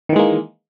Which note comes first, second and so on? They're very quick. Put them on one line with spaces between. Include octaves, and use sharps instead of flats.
D#3 E3 G#3 A#3